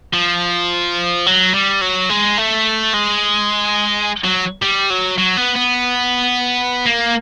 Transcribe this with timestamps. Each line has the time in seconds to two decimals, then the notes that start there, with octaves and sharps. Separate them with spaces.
0.13 F3
1.26 F#3
1.54 G3
1.81 F#3
2.10 G#3
2.38 A3
2.94 G#3
4.24 F#3
4.62 G3
4.90 F#3
5.18 F#3
5.37 B3
5.56 B3
6.86 A#3